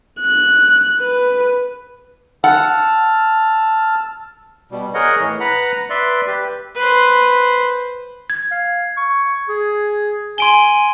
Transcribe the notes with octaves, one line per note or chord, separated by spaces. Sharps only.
F#6
B4
F#5 A5 E6 F6
B2 G3
G#4 A#4 C#5 D#5 F#5
A2 E3
B4 F#5 A#5 B5
B4 D5 E5 C6
G4 B4
B4 C5
G#6
F5
C#6
G#4
G#5 C6 D7 G7